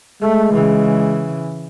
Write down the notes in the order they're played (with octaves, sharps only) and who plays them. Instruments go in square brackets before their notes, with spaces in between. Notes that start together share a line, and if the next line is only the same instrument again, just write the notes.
[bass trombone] G#3 [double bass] A3
[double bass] C#3 E3